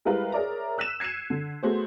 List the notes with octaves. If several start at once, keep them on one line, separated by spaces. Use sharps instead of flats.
G3 G#3 E4 A#4 B4 F5
G#4 A#4 C#5 D5 E5 A#5
E6 F#6 B6 D#7 E7
G#6 C7 C#7 D#7 E7
D3
A3 B3 F#4 G#4 C5